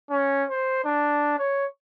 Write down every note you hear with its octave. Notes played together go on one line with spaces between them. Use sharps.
C#4
C5
D4
C#5